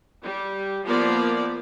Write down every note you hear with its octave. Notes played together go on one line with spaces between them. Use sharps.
G3
F3 A#3 B3 D5